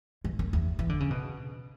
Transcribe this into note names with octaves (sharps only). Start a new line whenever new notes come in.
G2
F#2
E2
E3
D3
C#3
B2